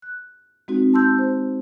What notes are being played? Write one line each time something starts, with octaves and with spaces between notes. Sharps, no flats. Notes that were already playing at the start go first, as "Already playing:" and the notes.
F#6
G#3 C4 D#4 F#4
A5 C6 E6 G6
C5